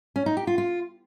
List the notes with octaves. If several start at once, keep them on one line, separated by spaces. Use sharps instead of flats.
C#4
D#4
G4
F4
F4